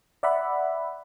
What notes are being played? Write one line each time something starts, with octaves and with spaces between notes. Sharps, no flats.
D5 E5 F#5 B5